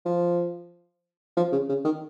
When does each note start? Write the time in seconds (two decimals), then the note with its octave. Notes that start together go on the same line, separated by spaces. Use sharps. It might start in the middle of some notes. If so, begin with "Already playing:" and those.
0.06 F3
1.37 F3
1.52 C#3
1.69 C#3
1.85 D#3